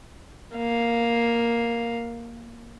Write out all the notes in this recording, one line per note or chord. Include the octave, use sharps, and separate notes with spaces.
A#3 F5